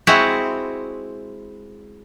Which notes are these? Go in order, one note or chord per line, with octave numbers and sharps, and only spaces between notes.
G#3 C4 E4 F#4 F#5